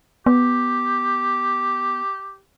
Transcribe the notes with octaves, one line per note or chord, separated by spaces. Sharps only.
B3 G4